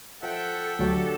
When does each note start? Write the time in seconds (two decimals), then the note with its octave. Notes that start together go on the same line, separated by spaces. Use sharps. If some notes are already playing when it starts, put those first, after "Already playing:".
0.23 F3 A4 E5 F#5 G5
0.79 D2 F#3 D4 F#4 G4 A4